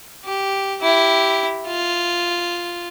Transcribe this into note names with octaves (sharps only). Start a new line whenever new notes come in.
G4
E4 G4
F4